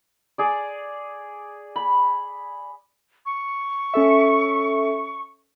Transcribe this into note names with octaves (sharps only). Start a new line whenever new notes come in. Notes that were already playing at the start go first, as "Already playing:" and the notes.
G#4 D5
B5
C#6
C#4 A4 E5